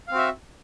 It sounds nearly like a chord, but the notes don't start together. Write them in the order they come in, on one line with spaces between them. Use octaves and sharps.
F5 C4 F#4 E5